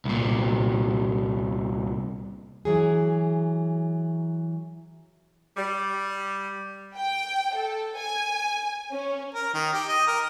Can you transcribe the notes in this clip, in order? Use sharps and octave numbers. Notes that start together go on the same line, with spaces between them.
C2 A#2
E3 F#3 G#4
G3
G5
A4
G#5
C#4
A#4
D#3
G4
D#5
A#4